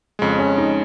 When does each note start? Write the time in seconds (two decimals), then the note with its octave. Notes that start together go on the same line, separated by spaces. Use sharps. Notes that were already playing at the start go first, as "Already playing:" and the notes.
0.19 F2 C#3 G#3
0.39 C#4
0.58 D#4